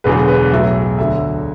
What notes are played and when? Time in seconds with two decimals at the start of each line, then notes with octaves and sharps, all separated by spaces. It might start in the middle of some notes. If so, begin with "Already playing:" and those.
0.04 E1 E2 D3 F#3 B4
0.28 B4
0.52 B1 A2 F#3 E5
0.99 D2 D3 F#3 E5